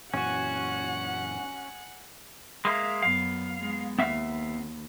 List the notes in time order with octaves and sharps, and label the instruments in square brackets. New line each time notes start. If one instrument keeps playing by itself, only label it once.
[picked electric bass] F#2 A#2 E3 [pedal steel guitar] C#4 F#4 [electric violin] F#5 [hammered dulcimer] G#5
[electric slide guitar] G#3 A#3 [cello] E5 F5
[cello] F#2 B3 [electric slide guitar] F5
[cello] G#3 B3
[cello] D#2 [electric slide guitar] B3 E5 F5